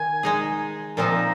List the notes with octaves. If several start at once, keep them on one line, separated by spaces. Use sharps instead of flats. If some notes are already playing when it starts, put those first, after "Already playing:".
Already playing: D#3 G#5
G#3 D#4 G#4
A#2 F3 C4 D#4 A#5